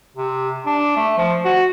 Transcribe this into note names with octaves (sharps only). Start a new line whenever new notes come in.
C3
D4
A3
F3
F#4